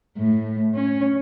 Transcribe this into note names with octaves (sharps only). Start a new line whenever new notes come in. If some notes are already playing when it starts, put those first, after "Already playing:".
A2
C#4